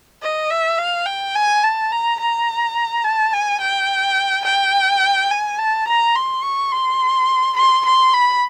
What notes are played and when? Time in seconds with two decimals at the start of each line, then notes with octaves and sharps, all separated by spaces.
0.22 D#5
0.50 E5
0.78 F5
1.06 G5
1.35 G#5
1.63 A5
1.92 A#5
2.20 A#5
3.04 A5
3.33 G#5
3.61 G5
4.45 G5
5.31 G#5
5.58 A5
5.87 A#5
6.15 C6
6.43 C#6
6.71 C6
7.57 C6
7.85 C6
8.13 B5